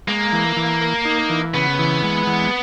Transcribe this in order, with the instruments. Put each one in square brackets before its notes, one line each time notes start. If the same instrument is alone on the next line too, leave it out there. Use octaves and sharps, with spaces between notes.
[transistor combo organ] G#3 [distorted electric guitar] A#3
[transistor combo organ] E3
E3
A#4
D#4
E3
[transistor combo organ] C#3 [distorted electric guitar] B3
[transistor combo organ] E3
G#3
E3